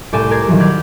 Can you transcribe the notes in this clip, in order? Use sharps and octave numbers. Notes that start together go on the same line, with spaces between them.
C2 A2 D5 G#5 G6 E7
A#4 D5 G#6 C7
A#2 D#3 E3 F#3 G3
D5 B5 F6 G6 G#6